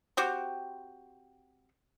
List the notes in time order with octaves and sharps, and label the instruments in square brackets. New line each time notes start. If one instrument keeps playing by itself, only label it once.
[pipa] C4 F#4 G4